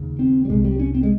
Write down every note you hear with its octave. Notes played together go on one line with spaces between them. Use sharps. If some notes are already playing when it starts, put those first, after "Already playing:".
Already playing: D#2 C#3
C4
G3
C2 C3 G#3
G3
C#4
C4
G#3